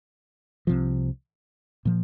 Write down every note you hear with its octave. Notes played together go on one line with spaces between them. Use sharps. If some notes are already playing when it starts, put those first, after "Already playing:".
C2 C3 F3
A#2 F3